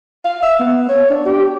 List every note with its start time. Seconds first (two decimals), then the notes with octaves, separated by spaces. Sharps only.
0.25 F5
0.42 E5
0.59 B3
0.89 C#5
1.10 D4
1.25 G4